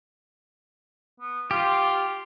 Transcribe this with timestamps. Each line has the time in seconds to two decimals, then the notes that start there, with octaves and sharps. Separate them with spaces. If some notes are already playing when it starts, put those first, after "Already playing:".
1.20 B3
1.51 F4 G4